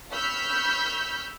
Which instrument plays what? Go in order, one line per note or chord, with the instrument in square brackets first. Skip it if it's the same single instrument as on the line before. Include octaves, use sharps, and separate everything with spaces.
[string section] B5 C#6 E6 F6 G6 B6